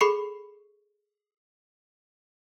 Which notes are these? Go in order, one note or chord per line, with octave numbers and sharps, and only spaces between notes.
G#4 A4 B5 C#6 C7 C#7